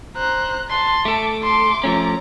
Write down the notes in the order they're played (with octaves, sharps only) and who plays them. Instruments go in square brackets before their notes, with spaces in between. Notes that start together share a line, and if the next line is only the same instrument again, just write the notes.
[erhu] C5 [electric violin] A#5 F#6
[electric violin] A5 [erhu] C6
[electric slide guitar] A3 A4 [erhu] D6
[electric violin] C6 [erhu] D6
[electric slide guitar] F3 A3 C#4 [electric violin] A#5